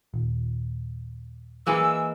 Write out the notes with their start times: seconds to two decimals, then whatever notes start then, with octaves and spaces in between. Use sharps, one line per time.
0.14 D#1
1.67 E3 G#3 A#3 E6